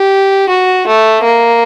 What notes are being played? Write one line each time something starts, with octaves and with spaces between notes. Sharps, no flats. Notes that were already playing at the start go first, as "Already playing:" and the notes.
Already playing: G4
F#4
A3
A#3